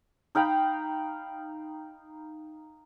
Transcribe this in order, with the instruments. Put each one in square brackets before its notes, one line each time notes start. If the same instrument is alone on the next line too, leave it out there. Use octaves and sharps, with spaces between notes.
[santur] D#4 F5 G5 B5